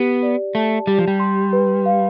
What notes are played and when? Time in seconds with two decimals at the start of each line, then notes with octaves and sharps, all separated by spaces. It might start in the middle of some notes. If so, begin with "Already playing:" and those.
Already playing: B3 G4
0.23 D5
0.55 A3 A5
0.87 G3 G4
0.98 F3
1.08 G3
1.20 C6
1.53 B4
1.86 F5